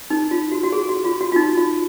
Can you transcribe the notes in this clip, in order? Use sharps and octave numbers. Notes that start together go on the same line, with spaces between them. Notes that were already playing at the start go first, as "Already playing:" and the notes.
D#4
F4
F#4
F#4
G#4
F#4
F4
F#4
F4
D#4
F4